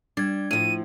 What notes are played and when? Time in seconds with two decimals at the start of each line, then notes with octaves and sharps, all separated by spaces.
0.17 G3 D4 G#6
0.51 A2 F3 D#7